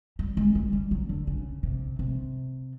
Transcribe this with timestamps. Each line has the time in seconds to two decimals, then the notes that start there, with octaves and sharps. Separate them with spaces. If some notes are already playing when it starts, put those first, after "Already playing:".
0.19 G3
0.37 G#3
0.55 G3
0.73 G3
0.91 F#3
1.09 D3
1.27 C#3
1.63 C3
1.99 C3